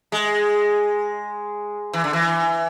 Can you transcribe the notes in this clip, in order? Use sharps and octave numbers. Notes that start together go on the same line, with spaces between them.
G#3
E3
D3
E3